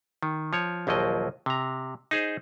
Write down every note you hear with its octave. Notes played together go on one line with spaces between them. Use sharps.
D#3
F3 C#5
A#1 D#2 F3 F#3 D#5
C3 A#5
D#4 G#4 C5